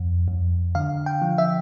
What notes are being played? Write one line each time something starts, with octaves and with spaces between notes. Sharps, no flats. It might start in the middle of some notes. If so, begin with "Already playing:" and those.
Already playing: F2
F2
D3 F5
G5
F3
E5